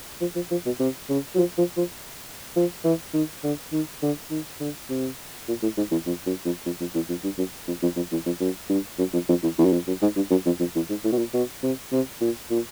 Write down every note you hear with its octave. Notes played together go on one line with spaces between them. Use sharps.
F3
F3
F3
B2
C3
C#3
F#3
F3
F3
F3
F3
E3
D#3
D3
D#3
D3
D#3
D3
C3
A#2
A2
G#2
E2
F2
F#2
F2
F2
F2
E2
F2
G2
F#2
F2
F2
F2
E2
F2
F#2
G2
F#2
F2
F2
E2
E2
F#2
F2
F#2
G#2
G2
F#2
F2
F2
E2
G#2
A2
B2
A#2
B2
C3
C3
A#2
A#2